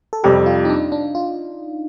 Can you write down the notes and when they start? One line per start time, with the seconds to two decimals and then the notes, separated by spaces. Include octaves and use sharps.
0.13 A4
0.24 F2 C3 G3 G4
0.46 F4
0.65 D#4
0.69 D4
0.92 D4
1.15 F4